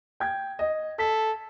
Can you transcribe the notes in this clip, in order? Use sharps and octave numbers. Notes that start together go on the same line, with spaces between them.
G5 G#6
D#5
A4 B6